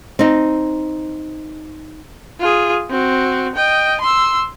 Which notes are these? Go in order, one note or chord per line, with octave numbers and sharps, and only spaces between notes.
C4 D#4
F4 G#4
C4 F#4
D#5 G5
C6 E6